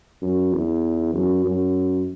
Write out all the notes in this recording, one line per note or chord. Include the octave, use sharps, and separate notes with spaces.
F#2
E2
F#2
F#2